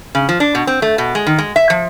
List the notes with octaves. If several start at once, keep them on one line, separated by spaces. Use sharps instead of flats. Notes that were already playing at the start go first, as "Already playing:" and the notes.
C#3
F3
D4
B2
C4
A3
B2
G#3
D#3
G#3
E5
F3